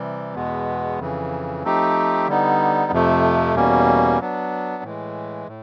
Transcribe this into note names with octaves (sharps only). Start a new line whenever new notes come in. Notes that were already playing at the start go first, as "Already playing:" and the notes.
Already playing: C3 E3 G3
E2 B2 G#3 B3
F2 C#3 E3
F3 A3 C4 D#4 G4
D3 G3 B3 D#4
F2 C3 F3 A3
E2 B2 G3 A#3 C#4
F#3 B3 D4
A2 E3 G#3
A2